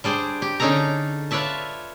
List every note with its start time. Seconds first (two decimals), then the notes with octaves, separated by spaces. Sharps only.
0.04 G3 D4 G#4 C5
0.42 G4
0.60 D3 C#4 D#4 G#4 A4 A#5
1.31 F4 B4 C#5 D5 E5 A5